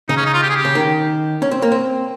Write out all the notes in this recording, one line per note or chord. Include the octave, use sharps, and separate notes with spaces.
C#3 D#4
C#4
D#4
F4
G4
G#4
G4
C#3
D#3
C#4
C4
A#3
C4